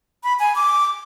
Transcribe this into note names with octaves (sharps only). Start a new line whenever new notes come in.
B5
G#5
D6